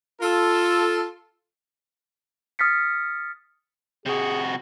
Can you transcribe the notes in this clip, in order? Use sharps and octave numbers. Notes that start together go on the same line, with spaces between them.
F4 A4
D#6 F6 A6 B6 C#7
C3 F#4 G#4